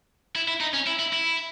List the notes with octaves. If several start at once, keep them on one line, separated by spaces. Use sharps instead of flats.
E4
E4
D#4
C#4
E4
E4
E4